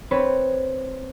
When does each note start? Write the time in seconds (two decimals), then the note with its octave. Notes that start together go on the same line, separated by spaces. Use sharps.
0.11 C4 B4 C#5